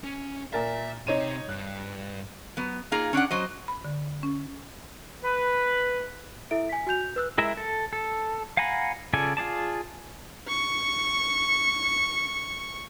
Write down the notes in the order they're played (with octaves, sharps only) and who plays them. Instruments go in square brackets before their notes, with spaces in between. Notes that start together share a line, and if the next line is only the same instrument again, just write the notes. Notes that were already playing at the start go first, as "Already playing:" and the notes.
[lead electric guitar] C#4
[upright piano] A#2 A#4 A6 [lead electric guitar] E5
[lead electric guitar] C3 [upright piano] D#4 C#5 D#7
[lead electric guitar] G2 [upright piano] F#6
[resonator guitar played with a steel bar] F#3 B3
A#3 D#4 F4 G#4 A#5
C#4 D4 D5 F#5
F#3 C5 D#5
[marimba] B5
D3
C#4
[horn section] B4
[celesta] E4 A4 E5 D7
G#5 B6
F#4 G#5 G6 F7
G6
B4 E6 F#6
[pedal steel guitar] G#3 E4 A#4 E5
A4
A4
F5 F#5 G#5 A#5 B5
C#3 F4 A4 D5 G#5
F4 G#4 D5 A5
[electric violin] C#6 C#7